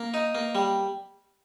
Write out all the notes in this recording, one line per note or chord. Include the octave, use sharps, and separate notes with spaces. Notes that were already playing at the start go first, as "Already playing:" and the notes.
Already playing: A#3
D#4
A#3
G3